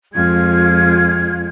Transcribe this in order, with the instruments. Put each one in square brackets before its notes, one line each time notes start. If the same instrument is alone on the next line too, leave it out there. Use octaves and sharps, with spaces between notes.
[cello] F2 G#3 [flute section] F4 G#6